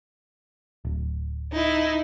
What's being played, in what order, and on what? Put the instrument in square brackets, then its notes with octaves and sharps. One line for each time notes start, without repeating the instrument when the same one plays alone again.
[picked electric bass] D1
[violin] D#4 E4